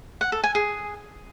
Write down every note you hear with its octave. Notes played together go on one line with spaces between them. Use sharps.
F#5
A4
G#5
G#4